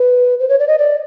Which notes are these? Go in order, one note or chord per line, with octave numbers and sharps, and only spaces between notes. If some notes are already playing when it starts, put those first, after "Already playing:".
Already playing: B4
C5
C#5
D5
D#5
D5